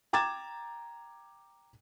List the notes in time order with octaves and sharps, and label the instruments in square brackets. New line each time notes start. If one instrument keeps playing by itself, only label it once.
[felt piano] G5 A#5 D6 G#6 A6 E7